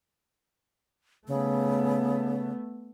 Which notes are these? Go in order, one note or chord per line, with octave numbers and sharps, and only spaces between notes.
C#3 A3 B3